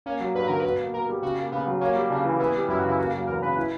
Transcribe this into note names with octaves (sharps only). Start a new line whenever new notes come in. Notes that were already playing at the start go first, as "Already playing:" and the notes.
A#3 C#4
F#3
G2 B4
D3 A#4
B2 B4
A#3
B2 A#4
G3
C#3 F#4
A#3
C#3 B3
F#3
A#3 C#4
G3
C#3 D4
E3
B3 E4
G3
F#2 E4
F#4
C#3 E4
A#3 F#4
F#3
E2 A#4
C#3 B4
E4